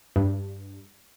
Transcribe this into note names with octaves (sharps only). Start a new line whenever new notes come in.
G2